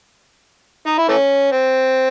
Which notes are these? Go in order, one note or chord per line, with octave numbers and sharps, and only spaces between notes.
D#4
E4
E3 A3 C#4
C4